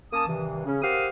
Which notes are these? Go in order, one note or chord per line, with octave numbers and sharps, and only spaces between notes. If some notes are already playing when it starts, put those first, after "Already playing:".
A#3 C#4 A5 D#6
G2 C3 D#3 E3
C#3 C#4
G4 A#4 C5 F5 F#5 D#6